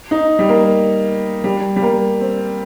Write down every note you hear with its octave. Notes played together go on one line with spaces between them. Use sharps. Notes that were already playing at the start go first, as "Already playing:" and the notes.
D#4
G3
A#3
G3
G3
A#3
C4